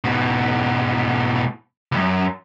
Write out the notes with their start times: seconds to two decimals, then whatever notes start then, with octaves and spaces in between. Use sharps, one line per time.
0.04 G#2 B2
1.92 C#2 F#2